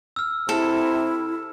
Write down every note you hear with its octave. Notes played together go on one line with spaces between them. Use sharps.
E6 F6
C3 E4 A4